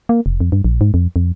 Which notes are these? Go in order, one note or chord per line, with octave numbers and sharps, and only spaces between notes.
A#3
F1
F2
G2
A#1
G#2
F2
F2